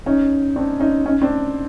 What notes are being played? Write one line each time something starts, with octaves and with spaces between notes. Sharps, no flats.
C#4 D#4
C4 D4
C#4 D#4
C#4 D#4
C4 D4